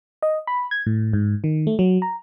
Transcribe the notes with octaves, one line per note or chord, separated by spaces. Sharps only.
D#5
B5
G#6
A2
G#2
D#3
A3
F#3
A#5